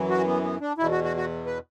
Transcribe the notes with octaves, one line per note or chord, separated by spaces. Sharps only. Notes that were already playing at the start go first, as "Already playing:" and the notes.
Already playing: F#2 E3
F#4
B3
B3
D4
E2 B2 E4
F#4
F#4
F#4
B4